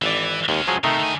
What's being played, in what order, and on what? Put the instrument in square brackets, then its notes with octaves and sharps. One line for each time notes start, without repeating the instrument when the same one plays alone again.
[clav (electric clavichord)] G#1 D5 [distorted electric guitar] E3
[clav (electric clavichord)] D#2 [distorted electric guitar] G#3 C#4
[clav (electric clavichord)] F3 F#3 G#4
[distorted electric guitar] C3 [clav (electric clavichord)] D#3 A3 D#4
[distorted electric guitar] D3 G#5